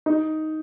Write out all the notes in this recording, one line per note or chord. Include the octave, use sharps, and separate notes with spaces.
D#4